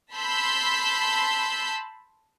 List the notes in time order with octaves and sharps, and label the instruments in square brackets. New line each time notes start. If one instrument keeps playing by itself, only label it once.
[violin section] A5 B5 C6 E6 G6 B6